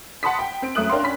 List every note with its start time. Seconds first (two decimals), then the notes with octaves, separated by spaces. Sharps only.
0.23 F#5 A5 B5 C6 D#6 B6
0.39 G5
0.62 C4 D7
0.75 F#2 A3 E5 D#6 F#6 F#7
0.90 C#4 D4 A#4 F5 G5 C6
1.03 C#4 B5 B6